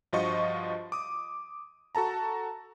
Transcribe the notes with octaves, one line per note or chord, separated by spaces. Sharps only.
G2 F3 F4 F#4 D#5 C#6
D6 D#6
F#4 A4 A5 A#5